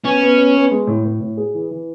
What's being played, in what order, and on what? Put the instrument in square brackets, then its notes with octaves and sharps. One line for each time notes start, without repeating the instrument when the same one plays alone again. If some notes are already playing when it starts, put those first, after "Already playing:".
[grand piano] B3 [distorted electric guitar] C#4
[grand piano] B3
B3
B3
G#3
A2
A2
A2
G#4
E3
E3